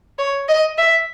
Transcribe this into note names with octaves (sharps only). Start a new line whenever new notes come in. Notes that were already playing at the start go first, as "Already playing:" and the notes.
C#5
D#5
E5